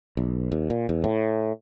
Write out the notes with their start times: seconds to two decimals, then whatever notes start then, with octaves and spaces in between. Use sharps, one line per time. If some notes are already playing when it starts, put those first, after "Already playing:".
0.17 B1
0.52 D#2
0.70 A#2
0.89 E2
1.04 A2